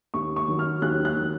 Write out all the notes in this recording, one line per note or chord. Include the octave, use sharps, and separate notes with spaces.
D#2 C#6
C#6
D#3 F#3
F6
D#2 F#6
F#6
D#3 F#3